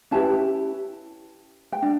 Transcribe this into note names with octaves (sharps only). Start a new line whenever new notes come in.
C#4 E4 G4 B4 A5
G5
D4